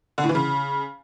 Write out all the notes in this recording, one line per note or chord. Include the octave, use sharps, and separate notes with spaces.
D3
A2
E3
C#3